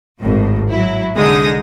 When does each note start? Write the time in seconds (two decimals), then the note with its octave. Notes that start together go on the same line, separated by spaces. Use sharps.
0.19 G#1 A2
0.70 F#3 E4
1.15 C2 D3 G#3 D#4 D#6 A#6